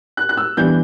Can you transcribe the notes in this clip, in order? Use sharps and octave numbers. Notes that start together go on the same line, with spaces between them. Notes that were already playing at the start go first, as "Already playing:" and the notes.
F#6
F#6
E6
E3 G3 B3 D4 G6